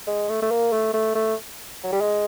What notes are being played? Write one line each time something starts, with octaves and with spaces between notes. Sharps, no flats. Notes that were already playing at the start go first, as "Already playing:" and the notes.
G#3
A3
A3
A#3
A3
A3
A3
F#3
G3
G#3